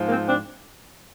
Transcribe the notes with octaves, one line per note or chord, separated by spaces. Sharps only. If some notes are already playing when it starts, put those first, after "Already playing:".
Already playing: G#2 F3
A#3 C4
C4 D4